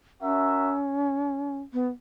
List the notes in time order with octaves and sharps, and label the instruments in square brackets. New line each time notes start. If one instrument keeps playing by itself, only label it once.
[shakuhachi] C#4 [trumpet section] F#4 A#4 E5
[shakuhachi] B3